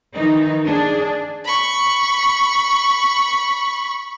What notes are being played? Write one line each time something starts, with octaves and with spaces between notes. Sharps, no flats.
D#3 E3 D#4
D4 G#4
B5 C#6